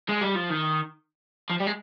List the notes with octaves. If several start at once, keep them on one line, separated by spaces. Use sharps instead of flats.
G#3
G3
F3
D#3
F3
G3
G#3